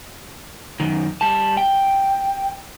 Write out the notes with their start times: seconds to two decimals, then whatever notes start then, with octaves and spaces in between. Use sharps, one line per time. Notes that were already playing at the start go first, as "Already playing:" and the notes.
0.80 F#2 D#3
1.21 G3 A5
1.57 G5